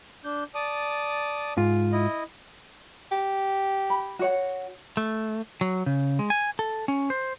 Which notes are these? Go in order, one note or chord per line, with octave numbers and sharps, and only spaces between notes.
D4 G6
D5 A5 D#6
G#2 F4
E4 D#5
G4
B5
F#4 C#5 F#5
A3
F#3
C#3
G#3
G#5
A4
C#4
C5